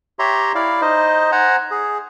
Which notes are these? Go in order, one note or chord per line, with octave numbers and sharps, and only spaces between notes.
G4 C#5 E5 A#5 C6
E4 D5 F5
D#4 C5 D#5
C5 F#5 G#5 A#5
G#4